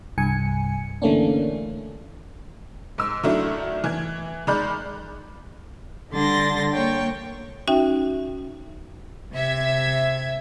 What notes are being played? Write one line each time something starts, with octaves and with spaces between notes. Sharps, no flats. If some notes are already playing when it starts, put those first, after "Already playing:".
C2 G2 G#5 C#7
D3 E3 A3 A#3 C#4 D4
G#2 E6
D#3 F#3 A3 D4 E4
E3 G#6
D#3 G#3 D5 B5 F#6 G6
D3 G3 D4 C6 A6 A#6
A#3 C#5 G5
C#4 D#4 F#4 E5 G5
C3 E5 G#6